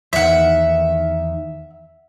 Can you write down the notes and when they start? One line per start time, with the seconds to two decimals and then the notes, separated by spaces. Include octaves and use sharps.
0.13 E2 D#3 E5 F#5